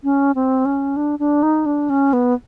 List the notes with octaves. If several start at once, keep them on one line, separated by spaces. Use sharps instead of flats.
C#4
C4
C#4
D4
D4
D#4
D4
C#4
B3